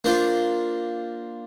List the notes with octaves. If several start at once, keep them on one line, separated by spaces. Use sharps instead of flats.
A#3 D4 F4 C5